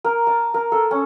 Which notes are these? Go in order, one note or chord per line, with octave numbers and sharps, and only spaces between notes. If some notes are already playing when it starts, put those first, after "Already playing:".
A#4
A5
A#4
A4
C#4